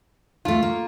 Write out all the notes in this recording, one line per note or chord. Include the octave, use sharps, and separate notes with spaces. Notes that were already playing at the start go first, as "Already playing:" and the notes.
D2 A3 F4
A#3